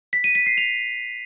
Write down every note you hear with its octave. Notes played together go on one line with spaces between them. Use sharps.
B6
D#7
B6
C7
F7